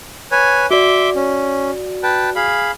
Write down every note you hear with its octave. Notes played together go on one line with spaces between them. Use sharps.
B4 C#5 G#5
F#4 D5 E5 C6 D6
C#4
B4 G5 A5
G#4 F5 B5